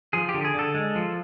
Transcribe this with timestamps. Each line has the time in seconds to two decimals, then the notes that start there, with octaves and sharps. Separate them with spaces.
0.13 F3 G#4
0.29 G4
0.34 D3
0.45 G#4
0.54 D3 A4
0.74 G#3
0.96 F3